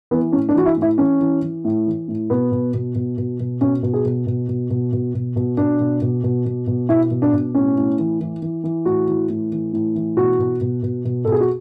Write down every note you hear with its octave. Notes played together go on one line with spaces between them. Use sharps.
E3 B3
A2 C#4
D4
E3 F#4
E4
A2
E4
E3 C#4
E3
E3
A2
E3
A2
B2 B3
B2
B2
B2
B2
B2
B2 C#4
B2
G#4
B2
B2
B2
B2
B2
B2
B2
B2 D4
B2
B2
B2
B2
B2
B2 E4
B2
D4
B2
A2 C#4
A2
E3
E3
E3
E3
A2 F#4
E3
A2
E3
A2
E3
B2 F#4
B2
B2
B2
B2
B2 A4
G#4
F#4